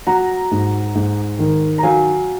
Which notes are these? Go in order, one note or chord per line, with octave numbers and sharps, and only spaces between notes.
F#3 F#5 A#5
G#2
G#2
D#3
A#5
F#3 F5 G#5